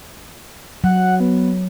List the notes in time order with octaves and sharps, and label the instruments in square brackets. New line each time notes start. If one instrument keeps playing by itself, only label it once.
[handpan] F#3 [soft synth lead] F#5
[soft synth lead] B3